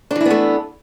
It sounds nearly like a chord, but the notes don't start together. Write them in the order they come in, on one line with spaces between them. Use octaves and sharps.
D4 E3 E4 B3 A3